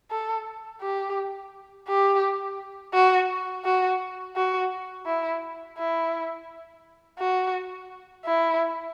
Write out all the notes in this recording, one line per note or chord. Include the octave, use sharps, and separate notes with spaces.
A4
G4
G4
F#4
F#4
F#4
E4
E4
F#4
E4